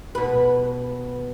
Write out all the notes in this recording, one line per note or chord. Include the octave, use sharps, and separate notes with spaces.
B2 B4